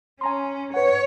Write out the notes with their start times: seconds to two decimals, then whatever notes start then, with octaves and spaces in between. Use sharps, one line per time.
0.21 C#4 G#5 A#5 C6
0.74 B4 C#5 F#5